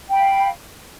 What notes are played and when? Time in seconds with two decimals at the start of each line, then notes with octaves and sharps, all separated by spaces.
0.08 G5
0.13 B5
0.18 F5